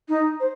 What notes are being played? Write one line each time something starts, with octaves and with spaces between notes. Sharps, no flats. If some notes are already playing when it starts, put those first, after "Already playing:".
D#4
C5